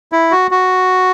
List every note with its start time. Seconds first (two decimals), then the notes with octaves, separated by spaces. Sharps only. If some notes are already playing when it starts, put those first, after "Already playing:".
0.12 E4
0.32 F#4
0.51 F#4